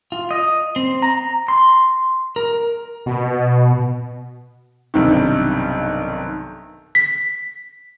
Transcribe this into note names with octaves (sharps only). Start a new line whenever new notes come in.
F4
D#5
C4
A#5
C6
A#4
B2
B1 G2 C3 D#3
B6